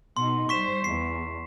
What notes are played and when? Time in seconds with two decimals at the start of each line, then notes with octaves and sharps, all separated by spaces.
0.17 B2 D#4 C6
0.49 G3 C5 C#6 B6 E7
0.84 E2 C7